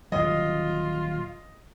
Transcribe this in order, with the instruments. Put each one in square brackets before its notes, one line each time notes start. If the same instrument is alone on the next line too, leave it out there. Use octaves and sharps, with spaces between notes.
[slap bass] D#1 F#3 [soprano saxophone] F4 [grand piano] D#5